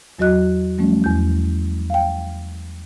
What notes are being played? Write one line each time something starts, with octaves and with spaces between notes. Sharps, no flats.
E2 F#3 F#4 D#5 F#6
F3 G3 A3 C#4
E2 G6
F5 G5